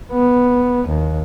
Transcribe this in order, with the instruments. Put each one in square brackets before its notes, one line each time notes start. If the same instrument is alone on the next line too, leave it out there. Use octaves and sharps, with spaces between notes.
[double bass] B3
D#2